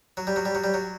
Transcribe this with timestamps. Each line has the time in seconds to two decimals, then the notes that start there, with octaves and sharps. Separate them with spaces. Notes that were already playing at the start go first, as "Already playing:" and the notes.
0.17 F#3
0.27 G3
0.36 F#3
0.45 G3
0.55 F#3
0.64 G3
0.74 F#3